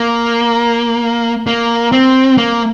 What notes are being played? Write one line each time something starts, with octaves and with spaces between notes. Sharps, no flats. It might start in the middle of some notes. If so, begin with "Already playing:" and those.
Already playing: A#3
A#3
C4
A#3